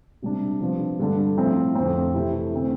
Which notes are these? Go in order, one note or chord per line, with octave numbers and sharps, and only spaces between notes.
C3 G3 D4
C3 F3 B3 D4
G2 D3 G3 D4
A2 F3 C4 E4
F2 D3 F3 A3 C4
C3 E3 A3 E4
D3 A3 C4